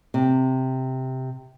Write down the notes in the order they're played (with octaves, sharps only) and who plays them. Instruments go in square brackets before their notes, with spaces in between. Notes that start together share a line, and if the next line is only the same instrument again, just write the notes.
[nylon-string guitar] C3